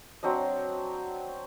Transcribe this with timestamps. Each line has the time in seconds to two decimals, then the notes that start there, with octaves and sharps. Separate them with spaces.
0.23 F#3 C4 D4 D#5